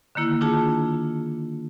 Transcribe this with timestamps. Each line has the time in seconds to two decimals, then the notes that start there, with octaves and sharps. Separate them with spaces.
0.15 D3 D#3 A#3 E4
0.41 D4 E4 F4 G#4 A5